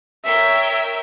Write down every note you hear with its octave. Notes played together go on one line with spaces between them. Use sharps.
A#4 C#5 E5 G5